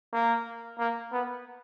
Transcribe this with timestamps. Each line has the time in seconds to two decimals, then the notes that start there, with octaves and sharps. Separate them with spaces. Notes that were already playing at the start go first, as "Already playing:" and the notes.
0.13 A#3
0.79 A#3
1.12 B3